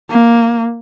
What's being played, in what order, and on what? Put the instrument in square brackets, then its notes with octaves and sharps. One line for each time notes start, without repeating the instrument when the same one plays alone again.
[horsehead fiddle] A#3